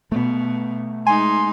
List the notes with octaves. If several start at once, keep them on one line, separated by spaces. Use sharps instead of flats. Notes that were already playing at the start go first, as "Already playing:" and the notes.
B2 A3 B3
G#3 D#4 G#5 C6